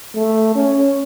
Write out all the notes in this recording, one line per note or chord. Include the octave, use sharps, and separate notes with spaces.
A3
C#4